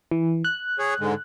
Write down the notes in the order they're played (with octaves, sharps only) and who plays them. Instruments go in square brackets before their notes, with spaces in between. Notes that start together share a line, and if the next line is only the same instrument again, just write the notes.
[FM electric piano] E3
F#6
[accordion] G#4 C#5
G#2 D3 G#3